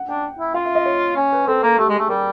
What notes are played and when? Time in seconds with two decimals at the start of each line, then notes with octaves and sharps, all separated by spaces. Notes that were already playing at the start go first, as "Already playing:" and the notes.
Already playing: F#5
0.09 D4 G5
0.39 E4
0.54 F4 F5
0.65 E5
0.75 D#5
0.86 C#5
1.16 C#4
1.32 B4
1.47 C4 A4
1.63 A#3 A4
1.78 A3 G4
1.89 G#3 G#4
1.99 A3
2.09 G3 A#4